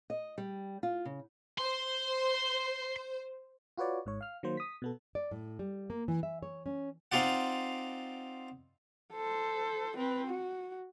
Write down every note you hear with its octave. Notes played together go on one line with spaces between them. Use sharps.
D#5
G3
F4
C#3
C5 C6
F4 F#4 B4 C#5 D5
G#1 G#2 C#5
F5 F6
D#3 F#3 A#3 C5
D#6 B6
B2 B3 A4
D5
A2
G3
A#3
E3
E5
C#5
C#4
C4 D#4 F4 D5 F#5
A4 C5
C4 B4
F#4